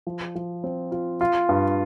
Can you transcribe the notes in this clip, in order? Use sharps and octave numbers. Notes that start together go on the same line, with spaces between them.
F3
F3
C4
F4
F4
G2